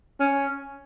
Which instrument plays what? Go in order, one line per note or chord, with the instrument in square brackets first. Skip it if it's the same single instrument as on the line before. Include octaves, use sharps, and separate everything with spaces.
[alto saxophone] C#4